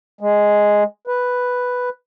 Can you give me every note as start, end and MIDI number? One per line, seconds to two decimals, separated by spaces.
0.21 0.83 56
1.07 1.89 71